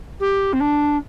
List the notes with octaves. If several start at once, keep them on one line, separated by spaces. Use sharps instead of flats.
G4
C4
D4